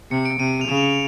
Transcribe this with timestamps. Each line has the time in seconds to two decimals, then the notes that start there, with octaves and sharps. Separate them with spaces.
0.11 C3 C#7
0.25 D7
0.39 C3 D#7
0.61 F7
0.68 C#3 E7
0.77 F7